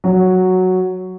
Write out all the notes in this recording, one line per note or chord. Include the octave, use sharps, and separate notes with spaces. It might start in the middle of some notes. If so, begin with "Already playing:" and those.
F#3